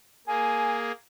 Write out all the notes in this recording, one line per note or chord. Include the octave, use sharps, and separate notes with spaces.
A#3 G#4 G#5